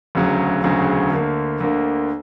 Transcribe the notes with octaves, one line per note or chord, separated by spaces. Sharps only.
E1 D2 C#3 F#3
E1 D2 C#3 F#3
D2 D3 A#3
D2 D3 A#3